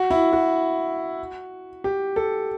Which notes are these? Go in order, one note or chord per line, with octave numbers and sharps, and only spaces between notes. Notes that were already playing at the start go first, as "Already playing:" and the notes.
Already playing: F#4
E4
F#4
G4
A4